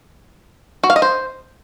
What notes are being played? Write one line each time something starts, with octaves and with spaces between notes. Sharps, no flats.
F#4
F5
D#5
C5